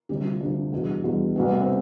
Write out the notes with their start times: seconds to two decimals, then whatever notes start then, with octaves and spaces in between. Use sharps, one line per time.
0.09 D2 C3 G3 G4
0.25 F4
0.40 D2 C3 G3 D4
0.72 E2 B2 G3
1.04 E2 B2 G3
1.36 C2 B2 G3 B3
1.46 B3
1.51 A3
1.62 C4